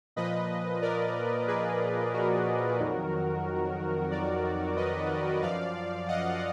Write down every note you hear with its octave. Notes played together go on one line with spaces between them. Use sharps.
A#2 F3 B4 D#5
A#4 D5
G#4 B4
F#4 A#4
F2 D#3 F#3
A#4 D5
B4 D#5
F#2 F3 D5 F5
D#5 F#5